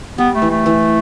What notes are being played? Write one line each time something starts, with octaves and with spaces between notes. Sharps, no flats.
G3 B3
A3
E3
A3
E3